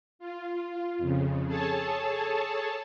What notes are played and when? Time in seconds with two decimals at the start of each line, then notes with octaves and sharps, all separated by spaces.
0.19 F4
0.98 F2 C#3
1.46 G#4 A4 C#5 A5